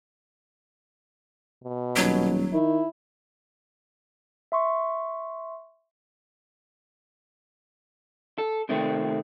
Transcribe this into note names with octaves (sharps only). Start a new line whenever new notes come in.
B2
D#1 F#3
D#3 E4
E5 C6 C#6
A4
C3 D#3 A3 C4